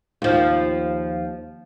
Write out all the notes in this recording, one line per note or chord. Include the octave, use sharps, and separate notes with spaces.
D#2 F3